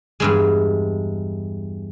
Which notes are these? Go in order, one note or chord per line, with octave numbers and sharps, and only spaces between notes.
E2 G2 G#3